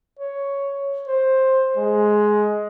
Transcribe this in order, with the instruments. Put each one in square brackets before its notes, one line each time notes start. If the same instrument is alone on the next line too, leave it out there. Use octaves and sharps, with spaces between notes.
[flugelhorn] C#5
C5
G#3